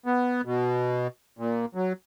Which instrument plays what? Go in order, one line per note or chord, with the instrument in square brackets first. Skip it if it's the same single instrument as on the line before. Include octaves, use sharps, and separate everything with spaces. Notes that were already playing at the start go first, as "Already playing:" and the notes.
[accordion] B3
B2
A#2
F#3